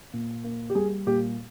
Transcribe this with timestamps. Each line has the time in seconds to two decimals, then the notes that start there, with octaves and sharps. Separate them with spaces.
0.13 A#2
0.44 A#3
0.70 G4
0.75 G3 G#4
1.07 A#2 G4